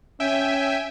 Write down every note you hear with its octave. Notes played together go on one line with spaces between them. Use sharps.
C#4 E5 G5 G#5